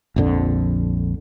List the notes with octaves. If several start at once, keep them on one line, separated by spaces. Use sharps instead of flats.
A#1 F2 D3